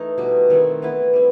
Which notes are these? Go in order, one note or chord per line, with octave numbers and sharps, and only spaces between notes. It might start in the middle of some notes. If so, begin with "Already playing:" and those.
Already playing: E3 A3 D#4 A4
B2 G3 B3
D#3 A3 C4 E4
E3 B3 E4 B4
G3 C4